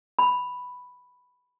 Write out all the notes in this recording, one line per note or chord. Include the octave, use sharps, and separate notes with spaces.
B5